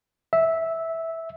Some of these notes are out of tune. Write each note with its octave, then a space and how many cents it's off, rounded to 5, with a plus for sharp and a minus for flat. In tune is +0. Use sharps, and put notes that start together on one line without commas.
E5 -10